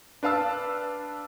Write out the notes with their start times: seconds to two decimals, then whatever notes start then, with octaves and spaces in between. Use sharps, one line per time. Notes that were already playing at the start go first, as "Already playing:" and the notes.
0.23 D4 B4 F5 A5 E6